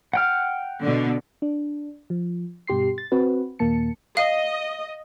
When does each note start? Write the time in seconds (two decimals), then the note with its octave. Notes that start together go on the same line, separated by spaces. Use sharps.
0.13 F#5 G5 F6
0.82 B2 D3
1.42 D4
2.10 F3
2.67 G2 B2 G4 C6 C7
2.98 A6
3.12 C4 F#4 B4
3.59 D#2 A#2 A#3 A5 C#7
4.17 D#5 F5